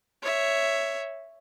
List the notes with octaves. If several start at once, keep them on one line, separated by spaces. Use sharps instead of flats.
C#5 E5